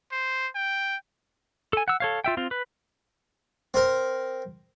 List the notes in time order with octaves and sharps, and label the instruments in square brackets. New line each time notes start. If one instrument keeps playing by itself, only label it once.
[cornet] C5
G5
[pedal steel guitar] A4 G#5
F#5 E6
A4 C#5 F5
F4 E5 G5
C4 F4
B4
[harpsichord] C4 A#4